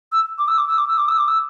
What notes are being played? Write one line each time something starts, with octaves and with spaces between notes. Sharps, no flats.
E6
D6
E6
D6
E6
D6
E6
D6
E6
D6
E6